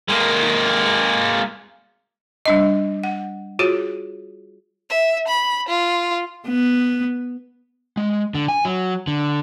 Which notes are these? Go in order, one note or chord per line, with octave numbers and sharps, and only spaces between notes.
G#3 A#3
G3 D4 D#5
F#5
F4 F#4 G#4 C#5
E5
B5
F4
B3
G#3
D3
G#5
F#3
D3